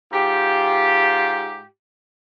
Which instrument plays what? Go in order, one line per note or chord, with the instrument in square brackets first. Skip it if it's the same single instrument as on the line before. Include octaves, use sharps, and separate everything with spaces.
[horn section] G#2 F4 G4